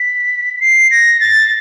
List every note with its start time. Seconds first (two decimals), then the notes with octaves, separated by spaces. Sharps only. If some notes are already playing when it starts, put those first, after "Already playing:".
Already playing: B6
0.61 C7
0.91 A#6
1.21 A6